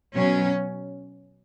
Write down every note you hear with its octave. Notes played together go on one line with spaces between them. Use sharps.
B2 F#3 C#4